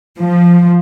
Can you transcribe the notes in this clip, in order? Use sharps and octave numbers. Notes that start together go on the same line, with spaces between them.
F3